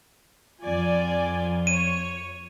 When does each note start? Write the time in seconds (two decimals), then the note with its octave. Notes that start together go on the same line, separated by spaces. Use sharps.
0.62 F2 F4 D5 G#5
1.67 C#5 D#7